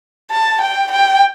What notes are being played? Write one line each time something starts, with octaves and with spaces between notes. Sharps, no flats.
A5
G5
G5